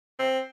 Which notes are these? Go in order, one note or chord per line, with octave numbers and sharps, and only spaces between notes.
C4